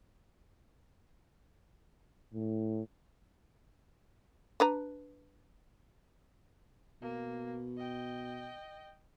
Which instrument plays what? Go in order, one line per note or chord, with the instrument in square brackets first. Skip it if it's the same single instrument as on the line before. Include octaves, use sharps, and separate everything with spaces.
[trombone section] A2
[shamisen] D4 B4 A#5
[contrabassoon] B2 [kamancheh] A#3
[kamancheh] D#5 G5